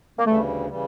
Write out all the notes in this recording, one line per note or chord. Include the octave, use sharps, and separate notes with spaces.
A#3
D2 C#3 E3 G3 A3
C#3 E3 G3